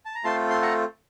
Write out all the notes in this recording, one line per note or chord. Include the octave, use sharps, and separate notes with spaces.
A5
A#5
A3 C4 F4 A4 A5 C6
C6
F#5 A#5